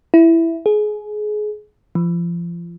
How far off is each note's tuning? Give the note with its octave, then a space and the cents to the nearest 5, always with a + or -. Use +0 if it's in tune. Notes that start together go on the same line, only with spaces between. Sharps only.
E4 +5
G#4 +25
F3 -30